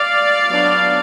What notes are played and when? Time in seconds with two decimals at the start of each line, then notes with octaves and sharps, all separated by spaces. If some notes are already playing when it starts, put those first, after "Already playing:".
Already playing: D5 F5
0.49 F#3 B3 D4